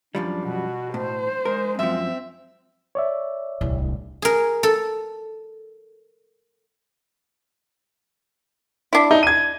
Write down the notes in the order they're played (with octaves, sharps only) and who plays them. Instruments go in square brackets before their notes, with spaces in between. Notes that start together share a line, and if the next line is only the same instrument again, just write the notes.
[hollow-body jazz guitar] F#2 F3 G3 [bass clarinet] D4
[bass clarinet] B2 [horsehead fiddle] F#4
[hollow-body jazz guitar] A2 [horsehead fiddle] C5
[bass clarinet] G#3 [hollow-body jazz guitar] A#4
[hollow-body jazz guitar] F#2 F3 [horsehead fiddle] C4 [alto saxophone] E5
[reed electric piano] C#5 D5 E5
[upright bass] D1 C2
[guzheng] G#4 A#4
A4
[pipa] D4 E4
[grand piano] D#4
G#6 D#7